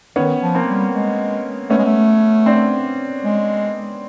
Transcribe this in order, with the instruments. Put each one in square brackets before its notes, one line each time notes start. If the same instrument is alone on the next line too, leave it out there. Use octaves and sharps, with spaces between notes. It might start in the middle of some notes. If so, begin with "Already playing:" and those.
[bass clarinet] D#3 [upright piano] B3 C#4
[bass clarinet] F3
[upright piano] A#3 C4
[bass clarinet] G3
G#3
[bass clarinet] A3 [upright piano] B3 C#4
[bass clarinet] G#3
A3
[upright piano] C4 D4
[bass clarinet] G#3